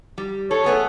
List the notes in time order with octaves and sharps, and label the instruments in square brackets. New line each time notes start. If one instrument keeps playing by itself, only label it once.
[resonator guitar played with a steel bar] G3
[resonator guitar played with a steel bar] A4 [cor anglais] C#5
[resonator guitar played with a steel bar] A3 B3 G#4